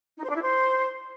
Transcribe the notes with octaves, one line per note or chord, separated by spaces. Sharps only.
D#4
C5
D4
E4
C5